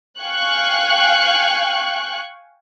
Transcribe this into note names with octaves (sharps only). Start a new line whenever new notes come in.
F5 G5 G#5 C#6 F#6